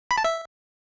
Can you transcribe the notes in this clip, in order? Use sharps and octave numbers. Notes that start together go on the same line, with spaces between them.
B5
A5
E5